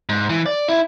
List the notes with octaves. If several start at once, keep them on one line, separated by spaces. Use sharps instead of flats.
G#2
E3
D5
E4